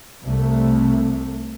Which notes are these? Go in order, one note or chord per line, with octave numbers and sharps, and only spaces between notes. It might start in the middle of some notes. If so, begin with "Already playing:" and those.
C2 C3 A3